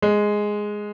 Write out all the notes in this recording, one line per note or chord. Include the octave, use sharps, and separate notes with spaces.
G#3